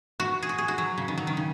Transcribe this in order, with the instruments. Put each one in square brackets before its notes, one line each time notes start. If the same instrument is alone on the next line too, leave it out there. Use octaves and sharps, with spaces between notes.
[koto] F#4
G#4
F#4
G#4
F#4
F#3
C#3
D#3
F#3
D#3
C#3